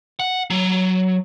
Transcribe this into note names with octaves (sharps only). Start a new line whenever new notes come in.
F#5
F#3